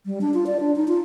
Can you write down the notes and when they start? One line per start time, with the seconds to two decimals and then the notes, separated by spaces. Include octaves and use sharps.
0.06 G3
0.21 D4
0.34 F4
0.46 D5
0.60 D4
0.76 D#4
0.88 F4